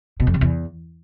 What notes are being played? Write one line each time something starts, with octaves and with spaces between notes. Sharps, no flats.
B2
F2
C3
E2